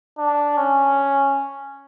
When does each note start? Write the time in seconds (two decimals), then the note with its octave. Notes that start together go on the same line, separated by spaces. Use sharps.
0.18 D4
0.57 C#4